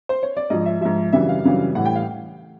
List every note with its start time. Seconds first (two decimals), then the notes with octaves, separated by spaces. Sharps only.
0.09 C5
0.23 C#5
0.37 D5
0.50 G#2 F3 D#5
0.66 E5
0.81 G#2 F3 E5
1.13 F#2 C#3 E3 G3 E5
1.29 F5
1.44 F#2 C#3 E3 G3
1.75 A2 E3 G3 F#5
1.85 G5
1.95 F5